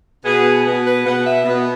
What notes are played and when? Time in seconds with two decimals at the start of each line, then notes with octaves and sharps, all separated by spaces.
0.25 B2 B3 G#4
0.65 B2 B3
0.84 B4
1.05 B2 B3 F#5
1.25 E5
1.45 B2 B3